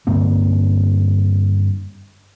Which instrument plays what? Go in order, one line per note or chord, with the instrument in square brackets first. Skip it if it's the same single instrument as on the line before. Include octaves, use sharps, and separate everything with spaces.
[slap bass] G2 D3 A#3 C4